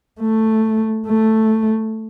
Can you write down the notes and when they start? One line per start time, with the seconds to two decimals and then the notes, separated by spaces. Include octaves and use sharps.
0.21 A3
1.07 A3